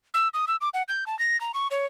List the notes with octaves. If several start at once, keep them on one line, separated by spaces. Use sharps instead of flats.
E6
D#6
E6
D6
F#5
G6
A5
A#6
A#5
C#6
C#5